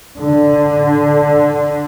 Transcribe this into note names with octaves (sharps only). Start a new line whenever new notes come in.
D3